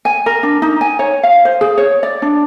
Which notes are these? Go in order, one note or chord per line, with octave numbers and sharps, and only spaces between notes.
G#5
A#4
D4
D#4
G#5
C#5
F5
C5
G#4
C#5
D5
D4